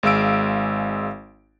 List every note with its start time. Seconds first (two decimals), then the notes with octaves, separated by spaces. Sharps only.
0.03 G#1 G#3 F5 E6 D7